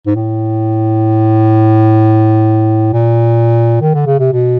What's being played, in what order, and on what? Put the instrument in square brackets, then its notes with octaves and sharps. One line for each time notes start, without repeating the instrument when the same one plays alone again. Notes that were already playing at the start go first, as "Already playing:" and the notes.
[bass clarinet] G#2
A2
A#2
D#3
D3
C#3
C3
B2